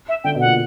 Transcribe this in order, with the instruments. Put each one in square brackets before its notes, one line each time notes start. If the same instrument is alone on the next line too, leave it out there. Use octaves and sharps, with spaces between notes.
[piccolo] E5
[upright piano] D3 [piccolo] G5
[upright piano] B2
[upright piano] A#2 [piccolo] F#5